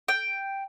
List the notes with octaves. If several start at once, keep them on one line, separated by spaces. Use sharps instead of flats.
G5